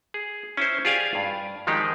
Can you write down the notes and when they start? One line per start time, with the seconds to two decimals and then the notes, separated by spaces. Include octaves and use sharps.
0.14 G#4
0.57 C#4 E4 C5
0.85 F4 G4 G#4 D5 F5 G#5
1.15 G2
1.67 D#3 F3 G#3 D#4 G4 G#4